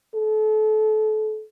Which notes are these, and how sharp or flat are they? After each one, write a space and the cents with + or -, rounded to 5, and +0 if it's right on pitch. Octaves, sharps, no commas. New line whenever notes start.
A4 -30